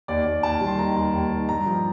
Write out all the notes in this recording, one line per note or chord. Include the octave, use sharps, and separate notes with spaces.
D#2 D5
D#2
D#2 A5
G3
C6
D#3 A#5
D#2
D#2
D#3
G2 A#5
F3